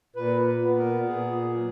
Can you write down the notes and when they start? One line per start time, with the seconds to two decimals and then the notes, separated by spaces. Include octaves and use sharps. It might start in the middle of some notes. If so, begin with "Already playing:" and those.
0.16 A#2 B4
0.47 B4
0.63 B3
0.78 A#4
1.08 A#2 G#4
1.55 F#3